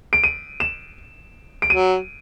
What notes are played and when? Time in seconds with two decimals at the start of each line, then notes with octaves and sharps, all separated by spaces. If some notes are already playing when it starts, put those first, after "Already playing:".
0.13 D7
0.24 D#7
0.60 E7
1.62 D7
1.70 F#3 D#7